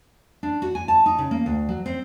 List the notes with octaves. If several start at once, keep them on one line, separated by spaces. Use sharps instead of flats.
D4
F#4
G#5
A5
D#4
C#3
A#3
D2
F#3
C4